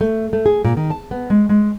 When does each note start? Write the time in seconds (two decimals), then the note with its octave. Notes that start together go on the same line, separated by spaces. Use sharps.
0.01 A3
0.33 A3
0.46 G#4
0.65 A#2
0.77 D#3
0.90 A5
1.11 B3
1.30 G#3
1.49 G#3